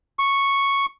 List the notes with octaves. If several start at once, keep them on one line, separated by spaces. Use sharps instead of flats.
C#6